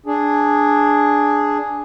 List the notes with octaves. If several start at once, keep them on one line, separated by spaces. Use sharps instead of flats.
D4 G#4